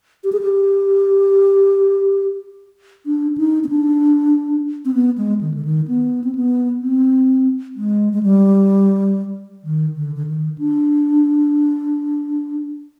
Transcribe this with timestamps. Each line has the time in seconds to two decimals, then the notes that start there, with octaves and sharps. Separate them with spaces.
0.24 G4
0.32 G#4
0.41 G4
3.06 D4
3.38 D#4
3.64 C4
3.69 D4
4.85 C4
4.94 B3
5.18 G#3
5.41 D#3
5.54 D3
5.65 D#3
5.88 B3
6.24 C4
6.35 B3
6.82 C4
7.76 G#3
8.13 G#3
8.23 G3
9.64 D#3
9.96 D3
10.15 D3
10.27 D#3
10.58 D4